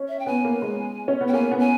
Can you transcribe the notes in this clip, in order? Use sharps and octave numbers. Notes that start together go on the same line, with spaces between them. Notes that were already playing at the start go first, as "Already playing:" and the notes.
Already playing: C#4
E5
G5
B3 G#5
A#3
G#3
C#4
B3
G5
A#3 G#5
B3
G#5